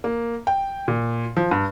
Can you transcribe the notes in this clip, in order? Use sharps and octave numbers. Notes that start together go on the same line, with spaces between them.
A#3
G5
A#2
F3
G2